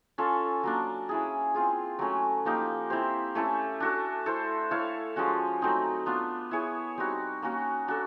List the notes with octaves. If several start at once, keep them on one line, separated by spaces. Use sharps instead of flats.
C#4 F4 A4
F#3 A#3 D4
C#4 E4 G#4
C4 F4 G#4
F#3 A3 C#4
F3 A#3 D#4 G4
C4 E4 G4 C5
A3 C#4 E4 A4
D4 F#4 A4
E4 A4 C5
E4 A4 C#5 F5
F3 G#3 C#4 F#4
F#3 A3 C4 D#4
B3 D4 F4
E4 G#4 C#5
G3 C4 D#4 F#4
A#3 C#4 F#4
D4 F#4 A4